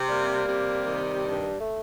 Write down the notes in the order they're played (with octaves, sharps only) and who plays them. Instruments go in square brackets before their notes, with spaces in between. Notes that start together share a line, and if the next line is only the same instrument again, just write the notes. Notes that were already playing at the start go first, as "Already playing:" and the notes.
Already playing: [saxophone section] C3
[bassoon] G3 [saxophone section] A#3
[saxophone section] C3
D#3
G2
[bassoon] A3